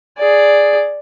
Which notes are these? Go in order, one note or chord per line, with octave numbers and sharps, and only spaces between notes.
G#4 D5